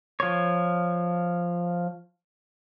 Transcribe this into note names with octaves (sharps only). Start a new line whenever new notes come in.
F3 C#5